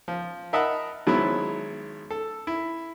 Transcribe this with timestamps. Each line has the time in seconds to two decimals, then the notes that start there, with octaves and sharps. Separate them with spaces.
0.08 F3
0.53 A#4 D#5 E5 F#5 A5 B5
1.07 G#1 F#3 G#3 B3 E4
2.11 A4
2.47 E4